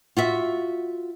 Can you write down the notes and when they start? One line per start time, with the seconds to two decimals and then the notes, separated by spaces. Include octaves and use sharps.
0.17 F4 F#4 E5